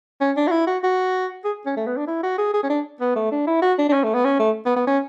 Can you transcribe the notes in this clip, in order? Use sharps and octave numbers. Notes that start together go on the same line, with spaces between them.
C#4
D4
F#4
E4
F#4
F#4
G#4
C#4
A3
B3
D4
E4
F#4
G#4
G#4
C#4
D4
B3
A3
D4
E4
F#4
D4
D4
C#4
A3
B3
C#4
A3
B3
B3
C#4